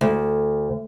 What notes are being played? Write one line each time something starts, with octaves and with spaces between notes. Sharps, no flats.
D2